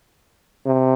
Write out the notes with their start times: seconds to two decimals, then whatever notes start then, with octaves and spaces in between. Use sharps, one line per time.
0.64 C3